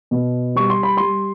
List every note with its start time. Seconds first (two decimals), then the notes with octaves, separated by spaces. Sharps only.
0.11 B2
0.55 G3 C#6
0.70 C6
0.83 B5
0.97 G3 C6